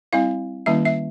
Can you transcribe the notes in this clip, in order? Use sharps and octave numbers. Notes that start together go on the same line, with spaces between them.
G3 C4 E4 F5
D#3 G3 A#3 C#4 E4 E5
E5